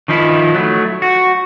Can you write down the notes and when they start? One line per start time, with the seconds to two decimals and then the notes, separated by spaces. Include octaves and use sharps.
0.08 D#3 F3 D#4 E4
0.54 F#3 A3
1.02 F#4